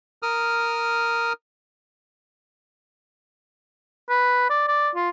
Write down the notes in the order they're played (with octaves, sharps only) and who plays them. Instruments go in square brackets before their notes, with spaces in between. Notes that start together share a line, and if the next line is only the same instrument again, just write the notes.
[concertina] A#4 D#6 F6
[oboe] B4
D5
D5
F4